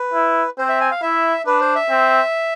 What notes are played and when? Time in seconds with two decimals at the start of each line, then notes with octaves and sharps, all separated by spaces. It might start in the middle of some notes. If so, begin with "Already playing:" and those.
Already playing: B4
0.13 E4
0.58 C4 C5
0.69 E5
0.80 G#5
0.91 F5
1.02 E4 E5
1.47 D4 B4
1.61 C5
1.76 E5
1.90 C4